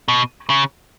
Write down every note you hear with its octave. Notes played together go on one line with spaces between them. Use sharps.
B2
C#3